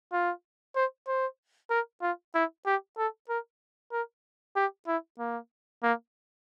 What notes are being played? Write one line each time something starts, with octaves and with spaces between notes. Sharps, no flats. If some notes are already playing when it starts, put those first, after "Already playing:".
F4
C5
C5
A#4
F4
E4
G4
A4
A#4
A#4
G4
E4
A#3
A#3